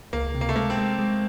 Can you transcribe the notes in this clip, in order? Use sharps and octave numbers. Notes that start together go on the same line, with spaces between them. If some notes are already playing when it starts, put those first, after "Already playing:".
C#2 A#3
C3
A#3
A3
G#3 A#3
C4
G#3
G#3